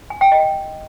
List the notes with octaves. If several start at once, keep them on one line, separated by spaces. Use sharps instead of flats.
G#5
G5
D#5